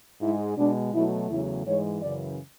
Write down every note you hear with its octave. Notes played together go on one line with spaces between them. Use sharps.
G#2 G#3 E4
B2 G#3 D4
B2 F#3 A3 E4
E2 C#3 F#3 A3 E4
G#2 E3 G#3 C#5
F#2 C#3 E3 D5